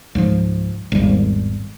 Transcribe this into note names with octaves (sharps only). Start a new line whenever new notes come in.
C#2 G#2 F3
G#1 E2 G3